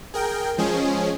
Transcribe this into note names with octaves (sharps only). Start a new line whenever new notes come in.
G#4 A#4 G5
F3 G#3 C#4 G#4